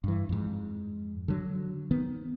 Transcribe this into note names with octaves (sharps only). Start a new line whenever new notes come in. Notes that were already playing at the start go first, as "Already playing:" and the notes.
G2 E3
F2 G#2
D3 F#3
D#3 B3